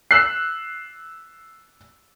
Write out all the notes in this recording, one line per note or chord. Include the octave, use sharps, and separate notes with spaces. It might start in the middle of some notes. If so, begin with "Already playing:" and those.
E6 F#6 C7